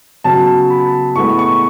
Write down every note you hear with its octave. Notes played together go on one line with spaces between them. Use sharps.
C#3 F#3 B3 A5
B5
A2 G#3 B3 C#6
C#6